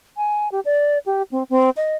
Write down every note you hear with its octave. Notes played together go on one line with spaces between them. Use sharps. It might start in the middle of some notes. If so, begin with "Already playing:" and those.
G#5
G4
D5
G4
C4
C4
D#5